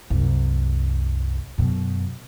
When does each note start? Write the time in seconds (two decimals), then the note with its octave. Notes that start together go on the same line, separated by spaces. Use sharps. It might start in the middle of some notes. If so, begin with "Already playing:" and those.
0.10 C2 F#2
1.58 F#2 B2